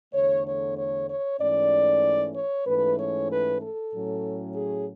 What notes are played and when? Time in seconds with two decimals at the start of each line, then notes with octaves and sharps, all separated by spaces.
0.14 E2 D3 A3 C#5
0.46 C#5
0.77 C#5
1.09 C#5
1.41 G#2 E3 A3 C#4 D5
2.35 C#5
2.67 G#2 E3 A3 C#4 B4
2.99 C#5
3.30 B4
3.61 A4
3.93 A2 F#3 C#4
4.56 G#4